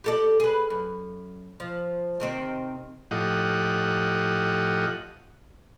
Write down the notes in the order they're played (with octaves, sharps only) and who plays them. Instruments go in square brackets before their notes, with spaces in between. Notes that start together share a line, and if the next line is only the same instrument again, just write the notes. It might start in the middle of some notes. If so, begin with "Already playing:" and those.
[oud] G4 A4 D5
G#4 B4
F#2
F3
C3 D#3 C4
[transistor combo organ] A2 F3 G4 D#5 F#5